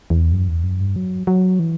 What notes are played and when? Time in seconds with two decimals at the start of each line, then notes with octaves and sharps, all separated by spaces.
0.10 E2
0.32 F#2
0.48 E2
0.63 F#2
0.80 G2
0.96 F#3
1.27 F#3
1.59 E3